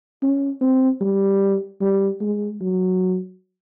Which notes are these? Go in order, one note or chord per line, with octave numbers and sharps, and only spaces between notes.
C#4
C4
G3
G3
G#3
F#3